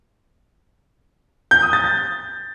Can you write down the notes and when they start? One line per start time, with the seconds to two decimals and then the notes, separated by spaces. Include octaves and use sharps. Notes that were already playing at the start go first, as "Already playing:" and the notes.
1.51 G6
1.62 D#6
1.73 A6
1.84 A6